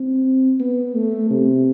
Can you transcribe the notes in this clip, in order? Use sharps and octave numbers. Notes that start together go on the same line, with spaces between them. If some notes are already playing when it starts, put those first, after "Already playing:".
Already playing: C4
B3
A3
C3